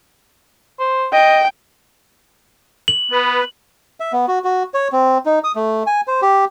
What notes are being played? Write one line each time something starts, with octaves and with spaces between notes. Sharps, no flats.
C5
D#5 G5
F#7
B3 B4
E5
B3
F#4
F#4
C#5
C4
D#4
D#6
A3
G#5
C5
G4